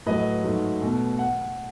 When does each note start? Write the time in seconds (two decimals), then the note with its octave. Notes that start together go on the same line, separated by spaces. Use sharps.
0.06 A2 F#3 A3 B4 D#5
0.44 G#2 F#3 A3
0.81 B2 A3
1.19 F#5